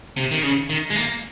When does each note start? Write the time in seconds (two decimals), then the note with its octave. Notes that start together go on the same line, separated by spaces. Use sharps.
0.17 C3
0.31 D#3
0.43 C#3
0.69 D#3
0.90 G#3
0.96 A#3